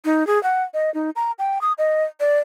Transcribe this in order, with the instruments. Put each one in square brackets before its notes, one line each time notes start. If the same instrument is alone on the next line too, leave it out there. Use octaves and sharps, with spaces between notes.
[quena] D#4
G#4
F#5
D#5
D#4
A#5
G5
D#6
D#5
D5